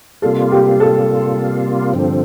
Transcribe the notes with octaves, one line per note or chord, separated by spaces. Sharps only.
C3 G3 A#3 F4 A4
G4
A4
G2 D3 F3 C4